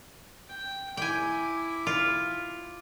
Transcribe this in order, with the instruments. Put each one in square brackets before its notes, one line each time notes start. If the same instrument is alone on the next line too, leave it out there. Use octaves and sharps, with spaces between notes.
[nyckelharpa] G5
[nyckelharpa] E4 D6 [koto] G5 G#5
[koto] F4